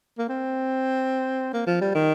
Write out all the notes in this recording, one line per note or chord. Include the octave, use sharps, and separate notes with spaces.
A#3
C4
A#3
F3
G3
D#3